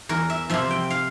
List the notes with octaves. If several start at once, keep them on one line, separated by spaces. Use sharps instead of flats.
E2 A#4
E5
C3 F3 E5
G5
F5